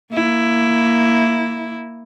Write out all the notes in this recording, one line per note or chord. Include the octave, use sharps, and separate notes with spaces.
A#3 E4